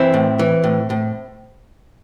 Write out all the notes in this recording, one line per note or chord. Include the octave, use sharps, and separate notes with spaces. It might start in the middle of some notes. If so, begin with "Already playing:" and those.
Already playing: E3 C4 E4
A2
E3
A2
A2